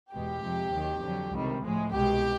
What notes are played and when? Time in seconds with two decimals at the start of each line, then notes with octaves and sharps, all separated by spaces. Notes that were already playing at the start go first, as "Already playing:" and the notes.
0.12 E2 B2 G#3 G4
0.42 F2 C3 F3 G#3
0.72 D#2 D#3 F#3
1.02 F2 D3 F#3
1.33 C#2 C3 D#3 G3
1.63 A2 F3 G#3
1.93 C2 B2 G#3 G4